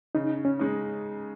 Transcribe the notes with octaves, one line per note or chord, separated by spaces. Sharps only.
C#3 D#4
C#4
G#3 D#4